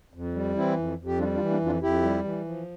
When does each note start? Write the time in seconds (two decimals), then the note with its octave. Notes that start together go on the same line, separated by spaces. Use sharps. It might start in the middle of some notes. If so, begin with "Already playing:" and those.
0.14 F2
0.34 G3
0.55 E3 C4 E4
0.76 F2
0.98 F2
1.06 G4
1.19 G3 D4 F4
1.34 D4 F4
1.40 E3
1.50 A#3 D4
1.60 F2
1.66 D4 F4
1.81 F2 E4 G4
2.02 G3
2.24 E3
2.45 F3